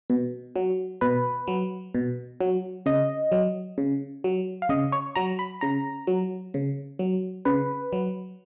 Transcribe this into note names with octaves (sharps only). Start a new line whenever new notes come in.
B2
F#3
B2 B4
F#3
B2
F#3
C#3 D#5
F#3
C#3
F#3
F5
C#3 D#5
C#5
F#3 A#5
B5
C#3 A#5
F#3
C#3
F#3
C#3 B4
F#3